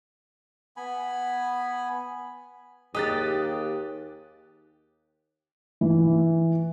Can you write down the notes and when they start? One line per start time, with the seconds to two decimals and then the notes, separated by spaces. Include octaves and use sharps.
0.77 B3 G#5 B5
2.95 D#2 G4 G#4 D#5 D#6 F#6 A6
5.81 E3